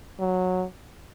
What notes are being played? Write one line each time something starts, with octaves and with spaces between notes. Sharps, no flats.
F#3